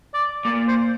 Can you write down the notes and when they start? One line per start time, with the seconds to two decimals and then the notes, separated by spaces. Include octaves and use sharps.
0.14 D5
0.45 A#2 D5
0.68 C5